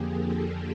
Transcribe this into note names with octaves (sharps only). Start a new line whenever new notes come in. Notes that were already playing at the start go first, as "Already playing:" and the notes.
Already playing: F2 D3 F3 A#3 G4 G#4
A4